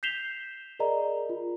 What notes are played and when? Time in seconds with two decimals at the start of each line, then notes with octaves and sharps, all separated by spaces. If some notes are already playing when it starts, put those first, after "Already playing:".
0.03 G6 B6 C7 E7 F7 G7
0.79 G#4 A#4 D5 D#5 A#5
1.29 F4